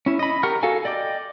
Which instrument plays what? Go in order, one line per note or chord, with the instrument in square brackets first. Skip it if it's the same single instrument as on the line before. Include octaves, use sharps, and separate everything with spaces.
[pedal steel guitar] C#4 E4
D#5 B5
G4 A#4 F#5 C#6 F6
F#4 A4 F5 G#5
D5 D#5 G5 D6